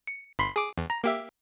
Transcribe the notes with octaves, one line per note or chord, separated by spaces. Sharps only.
C#7
G1 B5 C6
G#4 D6
E2
A#5
A#3 G4 E5